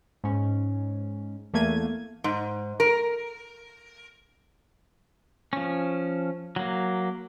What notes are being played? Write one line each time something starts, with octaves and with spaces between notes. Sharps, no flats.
G#2 C#4
E2 A3 A#3 G#6 D#7
G#2
A#4
F3 C#4
F#3 A#3